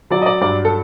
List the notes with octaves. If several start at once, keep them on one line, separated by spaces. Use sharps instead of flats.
F#3 D5
D#5
D5
G2 D5
A4